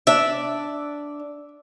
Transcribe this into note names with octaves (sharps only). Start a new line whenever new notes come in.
D4 D5 E5